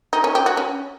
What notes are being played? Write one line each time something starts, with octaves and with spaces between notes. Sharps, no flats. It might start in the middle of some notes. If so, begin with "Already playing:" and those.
D#4
C#4
G4
F#4
C#4